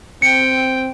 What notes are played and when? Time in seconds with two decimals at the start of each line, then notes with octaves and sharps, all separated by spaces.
0.22 C4 G5 C#7